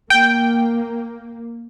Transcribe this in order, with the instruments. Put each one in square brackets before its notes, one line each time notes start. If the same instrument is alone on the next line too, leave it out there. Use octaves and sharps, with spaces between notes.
[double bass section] A#3 [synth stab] G5